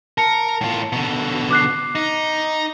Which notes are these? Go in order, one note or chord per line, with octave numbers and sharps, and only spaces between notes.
A#4 A5 C#7
A2 F4
B2 D3
D6 F#6 C7
D#4